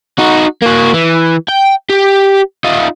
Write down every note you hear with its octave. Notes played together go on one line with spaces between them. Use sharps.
D#4 F#4
A#3 F#4
E3
G5
G4
D#4 F4